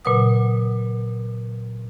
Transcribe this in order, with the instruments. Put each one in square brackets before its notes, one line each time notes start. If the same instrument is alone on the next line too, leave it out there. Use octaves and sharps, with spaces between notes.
[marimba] A#2 C#3 F#3 B4 F#5 D#6